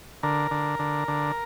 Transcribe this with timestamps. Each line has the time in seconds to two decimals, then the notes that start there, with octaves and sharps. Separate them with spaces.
0.23 D3 A#4
0.51 D3
0.79 D3
1.08 D3